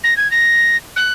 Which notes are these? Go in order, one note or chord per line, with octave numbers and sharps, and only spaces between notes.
A#6
G#6
A#6
F#6